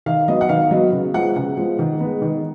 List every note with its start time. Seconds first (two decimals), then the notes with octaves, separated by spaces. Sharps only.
0.06 D#3 F5
0.28 F#3 B3 D#5
0.41 F#5
0.49 D#3 F5
0.71 F#3 B3 D#5
0.92 C#3
1.14 F3 G#3 B3 F#5
1.36 C#3 F#5
1.57 F3 G#3 B3
1.79 D#3
2.01 G#3 B3
2.22 D#3